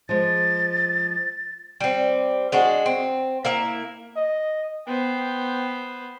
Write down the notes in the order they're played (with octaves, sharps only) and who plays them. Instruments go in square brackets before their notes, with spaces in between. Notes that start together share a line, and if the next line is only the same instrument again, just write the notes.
[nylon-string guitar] F3 G#3 [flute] A6
[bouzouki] G3 C4
G#3 D4 F#4
C4
A#3 E4 E5
[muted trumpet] D#5
[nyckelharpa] B3 C5 [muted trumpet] G5